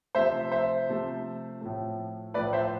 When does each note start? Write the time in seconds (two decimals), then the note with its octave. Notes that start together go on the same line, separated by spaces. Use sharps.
0.15 C3 F3 A3 C5 E5
0.52 C5 E5
0.89 C3 F3 A3
1.61 A2 F3 A3
2.34 A2 F3 A3 B4 D5
2.53 C5 E5